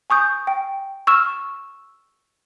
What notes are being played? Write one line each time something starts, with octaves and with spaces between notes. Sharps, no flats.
G#5 C#6 D#6 G6
G5
C#6 E6 F6 E7